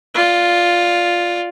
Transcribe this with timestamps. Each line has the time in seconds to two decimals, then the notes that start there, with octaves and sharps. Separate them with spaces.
0.14 F4 D5